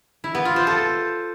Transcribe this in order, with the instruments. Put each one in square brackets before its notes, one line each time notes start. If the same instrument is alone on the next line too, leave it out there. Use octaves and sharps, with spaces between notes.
[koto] E4
B3
F4
C5
A4